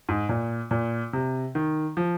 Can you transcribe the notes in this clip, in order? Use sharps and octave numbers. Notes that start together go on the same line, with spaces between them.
G#2
A#2
A#2
C3
D#3
F3